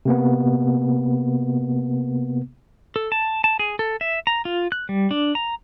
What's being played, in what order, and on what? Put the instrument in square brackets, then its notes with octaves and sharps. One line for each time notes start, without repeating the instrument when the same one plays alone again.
[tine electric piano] C3 A#3 B3
[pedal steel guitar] A4
A5
A5
G#4
A4
E5
A#5
F4
F#6
G3
D4
A#5